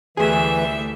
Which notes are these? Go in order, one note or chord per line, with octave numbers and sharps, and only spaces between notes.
D2 E3 G3 A3 G#4 E5